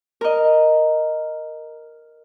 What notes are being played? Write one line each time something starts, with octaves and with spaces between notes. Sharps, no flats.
A#4 D#5